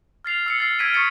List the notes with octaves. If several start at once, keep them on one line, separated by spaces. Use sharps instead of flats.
F6 A6 C7 F7
E6 C7 C#7
F6 A6 C7
E6 F6 G#6 B6 D7 D#7
C#6 D#6 E6 A6 C7 C#7